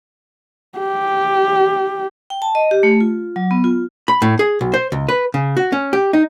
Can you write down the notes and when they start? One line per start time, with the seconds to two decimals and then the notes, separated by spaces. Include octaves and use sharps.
0.78 G4
2.30 G5
2.42 A5
2.55 D#5
2.71 G4
2.83 A3
3.00 F4
3.36 F#3
3.51 B3
3.64 F4
4.08 B5
4.22 A2
4.39 G#4
4.61 B1
4.74 C5
4.92 C#2
5.09 B4
5.34 C#3
5.57 F#4
5.72 C#4
5.93 G4
6.13 D#4